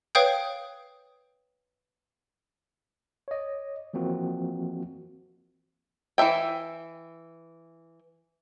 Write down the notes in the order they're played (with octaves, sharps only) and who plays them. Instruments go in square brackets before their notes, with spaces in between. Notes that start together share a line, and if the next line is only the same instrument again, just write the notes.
[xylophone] B4 C#5 F5 G5 D#6 G6
[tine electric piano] C#5 D#5
E3 F3 A#3 C4 F#4
[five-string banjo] E3 F#3 E5 G5